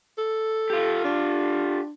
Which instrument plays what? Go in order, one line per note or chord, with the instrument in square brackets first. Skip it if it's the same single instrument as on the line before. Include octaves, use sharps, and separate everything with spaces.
[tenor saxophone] A4
[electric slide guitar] F4 G4
[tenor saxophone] D4